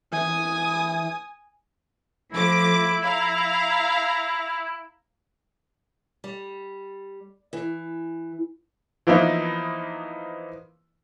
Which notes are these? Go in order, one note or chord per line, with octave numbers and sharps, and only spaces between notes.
E3 G#5 D#6
F3 A3 E4 D6
F5 A#5
G3
E3
E3 F3 A#3 B3 D#4 E4